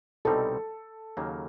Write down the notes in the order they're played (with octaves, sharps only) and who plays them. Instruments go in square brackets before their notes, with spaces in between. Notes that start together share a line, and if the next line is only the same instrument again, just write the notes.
[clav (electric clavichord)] C2 B2 G3 C4 D#4 [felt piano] A4
[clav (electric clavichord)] D#2 C#3 F#3 A#3